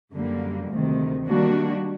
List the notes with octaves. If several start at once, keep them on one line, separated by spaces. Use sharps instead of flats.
F#2 D3 G3 A#3
D2 C3 D#3
D#3 G3 A#3 D4 F#4